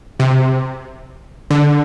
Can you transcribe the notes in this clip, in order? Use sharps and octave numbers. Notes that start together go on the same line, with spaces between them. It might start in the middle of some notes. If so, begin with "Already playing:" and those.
C3
D3